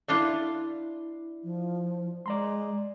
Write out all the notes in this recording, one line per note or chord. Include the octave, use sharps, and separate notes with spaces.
A3 D4 E4 F4 D5
F3
G#3 D5 A#5 C6